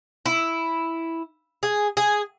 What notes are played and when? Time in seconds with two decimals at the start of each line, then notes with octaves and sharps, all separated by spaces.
0.26 E4
1.63 G#4
1.97 G#4